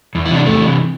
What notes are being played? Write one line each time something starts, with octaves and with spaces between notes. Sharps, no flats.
E2
E4
C3 E3 D4
E2 A3
C3 E3